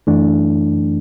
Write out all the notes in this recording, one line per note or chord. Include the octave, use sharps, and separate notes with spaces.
F#2 E3 A3 D4